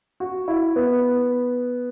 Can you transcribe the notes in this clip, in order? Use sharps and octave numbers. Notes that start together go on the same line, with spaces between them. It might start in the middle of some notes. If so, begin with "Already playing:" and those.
F#4
E4
B3